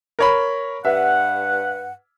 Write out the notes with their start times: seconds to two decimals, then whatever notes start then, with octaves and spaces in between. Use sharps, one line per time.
0.19 A#4 C#5 B5
0.85 G2 B4 E5 F#5